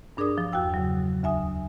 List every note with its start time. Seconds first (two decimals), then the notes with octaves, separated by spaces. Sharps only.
0.17 G2 D4 G#4 A#4 D5 D#6
0.38 F3
0.53 E2 F#4 F5 G5 E6
0.74 C#3 F3 F#3
1.23 D2 E5 G#5 D#6